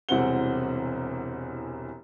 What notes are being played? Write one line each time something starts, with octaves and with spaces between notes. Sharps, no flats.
E1 C2 E3 C4 F#5 G7